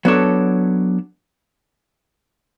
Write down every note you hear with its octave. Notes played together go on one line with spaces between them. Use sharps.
F#3 B3 D4 A4 C#5